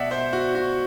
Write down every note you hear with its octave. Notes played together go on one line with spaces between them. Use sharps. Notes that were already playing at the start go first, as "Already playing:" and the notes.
Already playing: B2 D5 E5 F#5
C5 E5
F#4
F#4